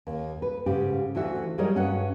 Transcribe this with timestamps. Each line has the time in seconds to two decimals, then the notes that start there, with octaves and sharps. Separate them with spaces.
0.07 D#2
0.42 B4
0.66 G#2 C#3 G4
1.15 D2 E3 F4 F#4 E5
1.58 F#3 G3 G#4 A#4 C#5 D#5
1.75 G2 C#4 F#4 F#5